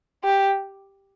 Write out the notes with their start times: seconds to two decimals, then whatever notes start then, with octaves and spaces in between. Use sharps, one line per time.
0.24 G4